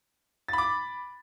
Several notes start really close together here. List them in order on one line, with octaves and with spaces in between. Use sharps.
A6 B5 D6